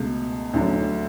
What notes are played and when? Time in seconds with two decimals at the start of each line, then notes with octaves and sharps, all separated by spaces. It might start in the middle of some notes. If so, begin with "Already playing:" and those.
Already playing: C#2 B2 A3
0.53 D2 D3 F#3